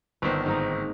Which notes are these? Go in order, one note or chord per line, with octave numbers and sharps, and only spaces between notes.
G1 D#3 B3 C4 C5
G#2 A#3 D#4